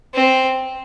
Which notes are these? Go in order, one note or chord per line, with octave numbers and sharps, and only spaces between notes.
C4